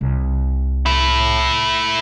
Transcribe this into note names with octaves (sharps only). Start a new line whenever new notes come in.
C2
A3 E4